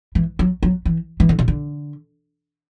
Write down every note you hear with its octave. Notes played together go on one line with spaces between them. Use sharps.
E3
F#3
F#3
E3
E3
D3
C3
D3